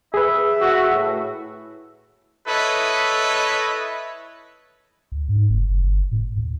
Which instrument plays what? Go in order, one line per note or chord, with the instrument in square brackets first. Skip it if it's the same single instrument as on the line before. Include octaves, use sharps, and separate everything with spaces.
[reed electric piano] G#4 B4 [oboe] E5
[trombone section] F#4
A2
[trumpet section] E4 A4 B4 C#5 D#5
[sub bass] D2
G#2
F#1
F#1
G1
A2
D#2